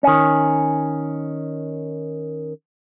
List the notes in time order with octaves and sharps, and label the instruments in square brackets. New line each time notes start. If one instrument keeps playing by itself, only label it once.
[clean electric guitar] D#3 C#4